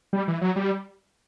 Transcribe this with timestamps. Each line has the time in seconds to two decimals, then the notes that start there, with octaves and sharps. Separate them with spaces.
0.13 G3
0.28 E3
0.41 F#3
0.56 G3